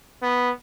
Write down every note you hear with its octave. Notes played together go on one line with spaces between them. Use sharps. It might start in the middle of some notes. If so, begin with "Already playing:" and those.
B3